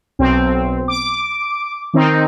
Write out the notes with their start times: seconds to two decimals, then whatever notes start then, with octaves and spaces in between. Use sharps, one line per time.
0.19 B1 C4
0.88 D6
1.94 D#3 C4 D#4